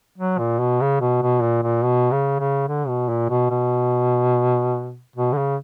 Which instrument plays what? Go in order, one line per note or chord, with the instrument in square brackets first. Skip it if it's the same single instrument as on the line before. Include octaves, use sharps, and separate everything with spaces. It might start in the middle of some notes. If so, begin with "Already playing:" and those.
[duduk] F#3
A#2
B2
C#3
B2
B2
A#2
A#2
B2
C#3
C#3
D3
B2
A#2
B2
B2
B2
D3
C#3